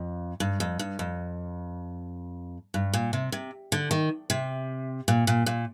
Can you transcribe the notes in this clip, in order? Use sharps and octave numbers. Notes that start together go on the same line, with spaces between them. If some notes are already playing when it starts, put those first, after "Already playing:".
Already playing: F2
G2
F2
G2
F2
G2
A#2
C3
C3
D3
D#3
C3
A#2
A#2
A#2